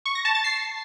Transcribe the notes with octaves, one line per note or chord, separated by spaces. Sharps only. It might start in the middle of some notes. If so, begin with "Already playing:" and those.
C#6
A#6
A5
A6
C7